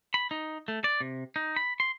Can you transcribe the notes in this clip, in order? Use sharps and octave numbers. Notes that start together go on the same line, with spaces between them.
B5
D#4
A3
D5
C3
D#4
B5
C6